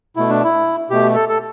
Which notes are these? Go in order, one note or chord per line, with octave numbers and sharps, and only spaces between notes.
B2 A3 E4
D4
E4
B2 A3 G4
A4
A4